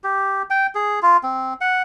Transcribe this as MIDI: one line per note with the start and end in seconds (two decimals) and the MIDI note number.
0.04 0.42 67
0.50 0.67 79
0.75 0.99 68
1.02 1.17 65
1.23 1.54 60
1.61 1.82 78